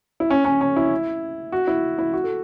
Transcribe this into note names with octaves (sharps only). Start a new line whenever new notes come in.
E4
C#4
C#4
C#4
E4
F#4
E4
E4
F#4
A4